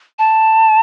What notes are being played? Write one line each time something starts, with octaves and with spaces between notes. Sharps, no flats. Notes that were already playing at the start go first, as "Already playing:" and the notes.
A5